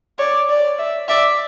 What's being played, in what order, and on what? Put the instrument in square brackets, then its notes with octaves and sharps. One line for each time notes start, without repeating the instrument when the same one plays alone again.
[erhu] C#5 [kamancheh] D5
[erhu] D5
[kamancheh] E5
[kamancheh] D5 [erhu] E5